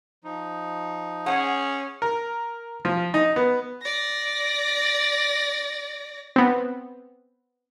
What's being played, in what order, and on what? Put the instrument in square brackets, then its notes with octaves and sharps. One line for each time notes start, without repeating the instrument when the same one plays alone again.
[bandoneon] F3 D#4
[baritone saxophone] C#4 [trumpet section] G#4 [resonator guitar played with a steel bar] F#5
[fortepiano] A#4
F3
D#4
B3
[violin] D5 A#6
[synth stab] B3 C4